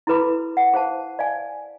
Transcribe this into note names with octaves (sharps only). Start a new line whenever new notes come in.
E4 F#4 A4 B4 B5 D6
F#5
G#4 C5 F5 A5
D5 F5 G#5